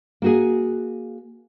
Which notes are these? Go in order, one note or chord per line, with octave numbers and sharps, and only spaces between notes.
A#3 F#4 G#4